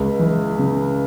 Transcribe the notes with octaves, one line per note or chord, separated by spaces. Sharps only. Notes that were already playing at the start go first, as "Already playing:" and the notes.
Already playing: C#2
E3
C#3